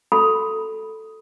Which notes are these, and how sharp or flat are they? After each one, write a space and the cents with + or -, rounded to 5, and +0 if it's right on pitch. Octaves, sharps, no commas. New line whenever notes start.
F#4 +0 A4 +0 B5 +0